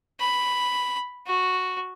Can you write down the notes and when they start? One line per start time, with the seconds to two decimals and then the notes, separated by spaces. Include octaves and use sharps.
0.20 B5
1.27 F#4